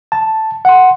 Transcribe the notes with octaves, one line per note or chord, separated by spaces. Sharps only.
A5
F#5 C6